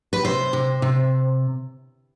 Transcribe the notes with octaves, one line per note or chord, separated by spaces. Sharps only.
B4
C3 C5
C3
C3